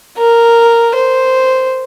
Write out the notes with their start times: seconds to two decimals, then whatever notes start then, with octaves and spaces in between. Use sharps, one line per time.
0.18 A#4
0.95 C5